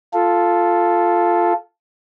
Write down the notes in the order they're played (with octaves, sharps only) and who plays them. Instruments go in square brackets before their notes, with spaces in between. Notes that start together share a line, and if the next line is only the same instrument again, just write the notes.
[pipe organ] F4 A4